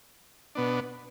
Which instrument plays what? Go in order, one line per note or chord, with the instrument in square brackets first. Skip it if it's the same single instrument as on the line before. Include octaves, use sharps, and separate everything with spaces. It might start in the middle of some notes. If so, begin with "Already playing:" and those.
[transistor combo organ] B2 B3 D4